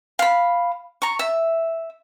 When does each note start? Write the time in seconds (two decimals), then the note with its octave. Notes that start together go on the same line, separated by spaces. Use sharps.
0.19 F5 B5
1.02 A#5 C#6
1.19 E5